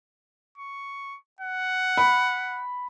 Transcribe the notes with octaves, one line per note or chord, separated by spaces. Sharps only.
C#6
F#5
B5